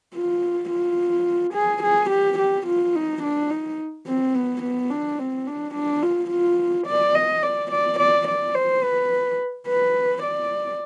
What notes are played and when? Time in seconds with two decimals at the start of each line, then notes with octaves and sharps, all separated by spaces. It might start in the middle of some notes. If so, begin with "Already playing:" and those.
0.15 F4
0.71 F4
1.54 G#4
1.83 G#4
2.10 G4
2.38 G4
2.67 F4
2.95 D#4
3.23 D4
3.50 D#4
4.07 C4
4.35 B3
4.63 B3
4.90 D4
5.19 C4
5.47 D4
5.75 D4
6.03 F4
6.31 F4
6.87 D5
7.15 D#5
7.43 D5
7.71 D5
7.99 D5
8.28 D5
8.55 C5
8.83 B4
9.67 B4
10.23 D5